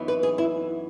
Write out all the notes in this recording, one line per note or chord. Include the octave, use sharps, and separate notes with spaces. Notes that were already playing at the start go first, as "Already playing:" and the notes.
Already playing: F#2 E3 B3 D#4
B4
G#4
E4